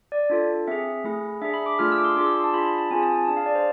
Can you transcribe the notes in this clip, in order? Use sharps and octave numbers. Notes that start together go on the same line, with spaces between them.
D5
D4 F4 A4
C4 G#4 E5
A3 E4 G#4
D4 G#4 E5
B5
D6
A3 D4 F4 G#4 F6
E6
D6
C6
D4 F4 G#4 D6
E6
C6
A5
D4 F4 G#4 B5
B5
A5
C4 F4 G#4 G#5
A5
A5
D4 G#4 A5
F5
D5
C5